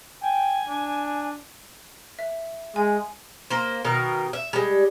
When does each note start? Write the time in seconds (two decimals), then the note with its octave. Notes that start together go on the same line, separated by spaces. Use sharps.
0.22 G5 G#5
0.68 D4
2.19 E5
2.76 G#3 G#5
3.50 A#3 C5
3.84 B2 D#3 A#4
4.33 E5
4.53 G3 G#3